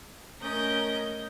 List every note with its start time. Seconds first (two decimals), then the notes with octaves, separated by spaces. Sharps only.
0.41 A3 C#4 A#4 D#5 G6 A#6